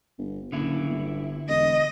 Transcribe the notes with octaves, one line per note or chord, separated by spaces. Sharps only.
G1
F#1 D3 E4
G1
E1 D#5